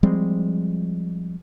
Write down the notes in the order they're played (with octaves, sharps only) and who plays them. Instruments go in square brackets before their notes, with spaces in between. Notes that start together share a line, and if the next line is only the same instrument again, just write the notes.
[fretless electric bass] F3 G3 G#3 C4